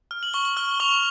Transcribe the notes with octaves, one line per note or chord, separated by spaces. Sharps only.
F6
F#7
C#6 G7
G7
F6 G7
C#6 F7